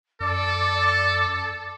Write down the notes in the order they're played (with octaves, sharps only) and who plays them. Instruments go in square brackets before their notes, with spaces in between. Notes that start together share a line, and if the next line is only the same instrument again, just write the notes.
[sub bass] F#2 [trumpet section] A4 [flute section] D5 D6